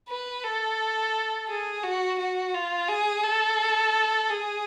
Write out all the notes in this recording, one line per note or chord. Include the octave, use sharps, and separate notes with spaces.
B4
A4
G#4
F#4
F#4
F4
G#4
A4
G#4